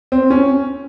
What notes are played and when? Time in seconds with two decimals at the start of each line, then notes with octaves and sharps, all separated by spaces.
0.12 C4
0.30 C#4